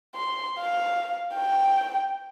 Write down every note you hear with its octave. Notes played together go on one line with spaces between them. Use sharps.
C6
F5
G5